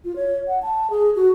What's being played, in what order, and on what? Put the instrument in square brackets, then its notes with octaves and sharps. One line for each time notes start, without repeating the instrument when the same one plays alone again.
[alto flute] F4
C#5
F#5
A5
G#4
F#4